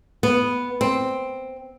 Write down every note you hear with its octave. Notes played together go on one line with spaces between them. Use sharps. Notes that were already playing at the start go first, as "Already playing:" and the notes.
B3
C4